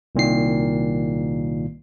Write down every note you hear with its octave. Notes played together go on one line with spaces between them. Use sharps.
C2 A#2 D#3 C7